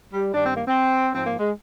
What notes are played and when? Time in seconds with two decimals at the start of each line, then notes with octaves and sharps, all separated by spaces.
0.13 G3
0.34 G2 D#3 G3 D4
0.45 C4
0.55 A#3
0.67 C4
1.14 G#2 F3 C4
1.26 A#3
1.38 G#3